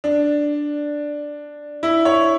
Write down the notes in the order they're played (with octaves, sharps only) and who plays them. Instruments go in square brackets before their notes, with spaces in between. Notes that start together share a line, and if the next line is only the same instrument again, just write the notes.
[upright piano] D4
E4
C#5